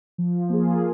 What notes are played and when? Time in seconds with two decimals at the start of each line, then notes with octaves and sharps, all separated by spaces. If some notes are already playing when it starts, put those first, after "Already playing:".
0.18 F3
0.50 A#3 F4 G#4